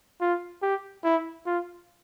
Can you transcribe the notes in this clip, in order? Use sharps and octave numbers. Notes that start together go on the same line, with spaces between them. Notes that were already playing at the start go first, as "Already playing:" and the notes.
F4
G4
E4
F4